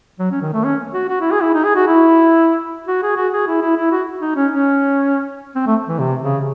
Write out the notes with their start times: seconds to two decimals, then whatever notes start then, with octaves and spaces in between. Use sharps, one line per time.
0.19 F#3
0.31 C#4
0.42 D#3
0.53 A3
0.64 C#4
0.94 F#4
1.09 F#4
1.20 E4
1.31 G#4
1.42 E4
1.54 D#4
1.64 G#4
1.75 F#4
1.87 E4
2.88 F#4
3.02 G#4
3.17 F#4
3.33 G#4
3.47 E4
3.62 E4
3.77 E4
3.91 F#4
4.21 D#4
4.36 C#4
4.51 C#4
5.55 C4
5.66 A3
5.88 E3
5.99 C3
6.22 C#3